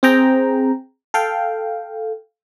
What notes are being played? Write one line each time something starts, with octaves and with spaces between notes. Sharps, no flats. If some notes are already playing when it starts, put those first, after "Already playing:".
C4 G#4 G5 A#5
A4 F5 G5